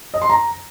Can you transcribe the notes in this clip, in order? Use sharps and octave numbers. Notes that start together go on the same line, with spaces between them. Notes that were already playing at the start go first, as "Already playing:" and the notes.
D#5
C6
A#5